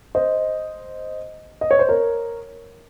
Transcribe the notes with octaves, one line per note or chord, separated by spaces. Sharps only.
C5 D#5
D#5
C#5
C5
A#4 C#5